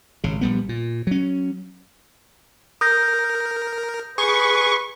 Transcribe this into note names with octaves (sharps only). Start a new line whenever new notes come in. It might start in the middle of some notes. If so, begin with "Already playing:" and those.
G#1 C#3
A#1 G3 B3
A#2
F#3 C#4
A#4 D#6 G6 A#6
G#4 B4 C#6